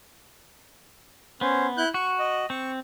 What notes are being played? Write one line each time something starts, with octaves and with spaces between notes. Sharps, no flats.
B3 C#4 C5
E4 F#6 G6
F#4 C#6
D#5
C4 C#6